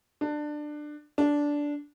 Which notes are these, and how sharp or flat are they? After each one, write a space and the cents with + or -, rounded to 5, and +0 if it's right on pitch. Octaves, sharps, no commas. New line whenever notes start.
D4 +20
D4 -10